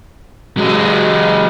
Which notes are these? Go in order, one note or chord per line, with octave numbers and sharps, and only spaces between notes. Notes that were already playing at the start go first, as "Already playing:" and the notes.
F#3 G#3